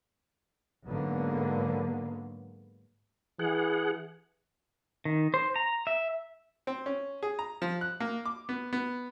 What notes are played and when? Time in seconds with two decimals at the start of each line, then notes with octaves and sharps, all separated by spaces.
0.86 G#2 D3 F#3 A#3 B3
3.39 E3 G#4 F#5
5.05 D#3
5.34 C5
5.56 A#5
5.87 E5
6.67 C4
6.86 C#4
7.23 G#4
7.39 A#5
7.62 F3
7.81 F#6
8.00 A#3
8.26 D6
8.49 B3
8.73 B3